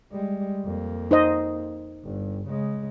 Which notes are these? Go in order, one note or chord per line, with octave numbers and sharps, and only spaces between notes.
G3 G#3
F2 A#3
D#4 C5 D#5
G1
C#3 G#3